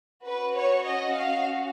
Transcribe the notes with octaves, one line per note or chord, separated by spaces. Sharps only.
C#4 F#4 B4
C#5
D#5
F5